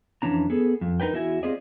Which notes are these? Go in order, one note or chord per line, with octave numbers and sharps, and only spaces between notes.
F2 E3 C#4 D4 A#5
B3 G#4 A4
F2
D#4 A#4 B4 G5
E2 E4 F#4 E5 G#5
C4 F4 G4 G#4 D5 D#5